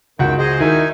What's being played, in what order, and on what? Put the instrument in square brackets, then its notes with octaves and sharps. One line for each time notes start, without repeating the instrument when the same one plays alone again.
[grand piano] C#2 F#4 F#5 [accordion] F#2 D#3 G5
[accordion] G#4 C5 D#5
[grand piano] D#3 E4 [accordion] D#4 G#5